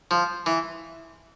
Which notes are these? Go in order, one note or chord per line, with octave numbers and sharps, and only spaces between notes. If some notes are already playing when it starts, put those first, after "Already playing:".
F3
E3